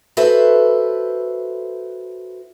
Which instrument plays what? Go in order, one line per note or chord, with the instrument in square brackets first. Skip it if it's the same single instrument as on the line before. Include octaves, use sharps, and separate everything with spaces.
[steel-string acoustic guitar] F#4 A4 B4 C5 E5